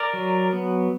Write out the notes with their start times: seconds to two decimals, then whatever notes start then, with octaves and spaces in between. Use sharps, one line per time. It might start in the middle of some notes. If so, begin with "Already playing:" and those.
Already playing: A#4 D5
0.13 F#3
0.53 B3